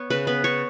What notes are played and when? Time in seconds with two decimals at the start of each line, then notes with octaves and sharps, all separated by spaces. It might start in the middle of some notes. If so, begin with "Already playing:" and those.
Already playing: B3 C#5
0.10 C#3 B4
0.27 B3 B4
0.44 C#3 C#5